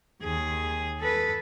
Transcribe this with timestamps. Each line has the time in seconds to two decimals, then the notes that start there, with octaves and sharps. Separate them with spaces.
0.22 D#2 G#4
1.00 A4 B4